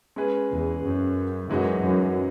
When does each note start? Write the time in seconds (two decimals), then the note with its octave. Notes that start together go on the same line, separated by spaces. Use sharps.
0.16 G#3 C#4 G#4 B4
0.50 E2
0.83 F#2
1.49 F#2 E3 G#3 D#4 F#4
1.83 F#2